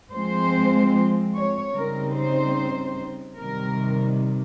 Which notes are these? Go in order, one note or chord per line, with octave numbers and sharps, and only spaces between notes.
F3 G#3 C4 C5
C#5
C#3 G3 C4 D#4 A#4
C5
C3 D#3 G3 A#4